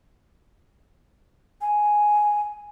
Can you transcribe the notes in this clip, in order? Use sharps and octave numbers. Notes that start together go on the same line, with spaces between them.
G#5